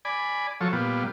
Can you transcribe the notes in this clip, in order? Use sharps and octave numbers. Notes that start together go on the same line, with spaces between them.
D5 G#5 B5
F3 F#3 A4 C#5
A#2 G3 B3 F4